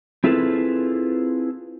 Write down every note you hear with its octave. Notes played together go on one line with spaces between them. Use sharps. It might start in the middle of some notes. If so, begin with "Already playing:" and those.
C4 E4 F4 G#4 A4 B4